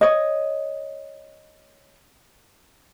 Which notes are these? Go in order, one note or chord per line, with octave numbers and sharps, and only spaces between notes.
C#5 D#5